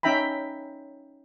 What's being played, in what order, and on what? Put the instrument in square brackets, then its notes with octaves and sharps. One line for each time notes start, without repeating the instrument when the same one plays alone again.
[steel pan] C#4 D#4 E5 G5 A#5 B5